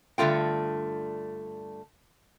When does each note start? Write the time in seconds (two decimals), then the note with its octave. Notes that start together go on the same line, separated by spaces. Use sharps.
0.18 G2 D3 A3 F4 G5